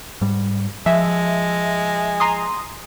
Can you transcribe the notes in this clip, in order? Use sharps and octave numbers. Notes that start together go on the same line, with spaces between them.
G#2 G3
F3 G#3 E5
A#5 C6 D#6